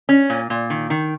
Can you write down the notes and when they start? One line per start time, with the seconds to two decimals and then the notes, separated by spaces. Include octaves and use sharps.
0.09 C#4
0.30 A#2
0.50 A#2
0.70 D#3
0.90 D#3